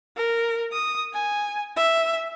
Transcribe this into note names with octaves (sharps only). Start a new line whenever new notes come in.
A#4
D#6
G#5
E5